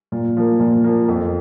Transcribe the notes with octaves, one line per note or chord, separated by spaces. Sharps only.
A#2
F3 A#3
A#2
F3 A#3
F2